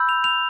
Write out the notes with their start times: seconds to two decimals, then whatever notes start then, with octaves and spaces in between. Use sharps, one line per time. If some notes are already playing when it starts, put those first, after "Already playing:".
Already playing: B5 E6 G6
0.09 F7
0.24 F7